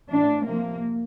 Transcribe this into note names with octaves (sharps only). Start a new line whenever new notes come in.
A2 E3 D4
C3 F3 A#3